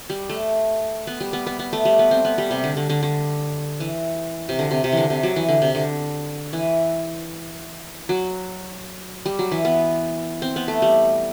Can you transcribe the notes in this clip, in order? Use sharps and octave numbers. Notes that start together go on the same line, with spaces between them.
G3
A3
B3
G3
B3
B3
B3
A3
G3
B3
C4
B3
G3
C3
D3
D3
D3
D3
E3
C3
D3
C3
C3
D3 E3
C3
F#3
E3
D3
C3
D3
E3
F#3
G3
F#3
E3
B3
C4
B3
A3
G3